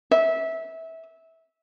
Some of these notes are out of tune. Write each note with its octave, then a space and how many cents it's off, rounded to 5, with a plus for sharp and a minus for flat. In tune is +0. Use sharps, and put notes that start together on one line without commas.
E5 -20